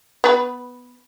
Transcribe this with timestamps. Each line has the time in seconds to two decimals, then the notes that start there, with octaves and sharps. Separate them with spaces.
0.24 B3 B4